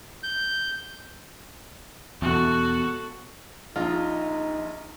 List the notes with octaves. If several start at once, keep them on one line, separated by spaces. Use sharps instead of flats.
G6
E2 B2 F#4 A4
A#1 D#4 F4 D#5